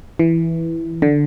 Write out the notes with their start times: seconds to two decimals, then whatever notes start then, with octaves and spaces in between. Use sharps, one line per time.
0.19 E3
1.02 D3